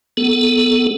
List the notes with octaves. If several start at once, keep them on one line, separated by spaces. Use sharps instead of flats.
B3 A4